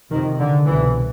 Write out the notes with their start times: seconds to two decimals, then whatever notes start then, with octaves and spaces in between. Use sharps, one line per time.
0.11 F2 C3 D#3
0.39 D3
0.67 C2 B2 E3